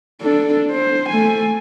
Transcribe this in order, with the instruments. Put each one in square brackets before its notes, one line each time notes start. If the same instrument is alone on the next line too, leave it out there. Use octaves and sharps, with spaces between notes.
[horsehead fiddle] D4 A4
C5
A3 G#5